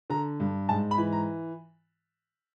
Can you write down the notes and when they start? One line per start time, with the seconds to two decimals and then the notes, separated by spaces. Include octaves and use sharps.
0.10 D3 A#5
0.40 G2
0.69 G#2 A5
0.91 B5
0.98 E3
1.12 A#5